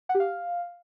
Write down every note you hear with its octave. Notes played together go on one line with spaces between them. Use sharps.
F#5
G4
F5